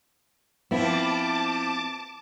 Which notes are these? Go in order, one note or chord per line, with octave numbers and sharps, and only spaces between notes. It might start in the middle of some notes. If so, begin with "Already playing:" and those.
F3 B3 C4 E4 A5 D6